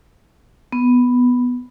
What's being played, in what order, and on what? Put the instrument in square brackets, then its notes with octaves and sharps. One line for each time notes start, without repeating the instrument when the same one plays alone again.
[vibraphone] B3